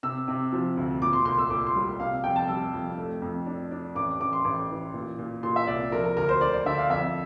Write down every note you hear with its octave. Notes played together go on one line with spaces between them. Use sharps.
C3 E6
C3
F3
D2
A#2 D6
C6
C2 C6
E6
A#2 D6
C6
G3
C3 F5
F2 G5
A5
G3 E6
F2
A3
F2
D4
D4
A1 D6
A1 D6
C6
A1 D6
E3
A#2
A#2
A#2 C6
E5
C2 D5
F3 A#4
A#4
D2 A#4
C5
D3 D5
D5
D3 E5
F5
F2 E5